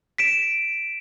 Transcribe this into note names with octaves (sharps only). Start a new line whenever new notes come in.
B6 D7 E7